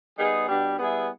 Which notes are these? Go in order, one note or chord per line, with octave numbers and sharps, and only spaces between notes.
G3 B3 D#4 G#4
B2 G3 B3 D4 G4
G3 B3 E4 G#4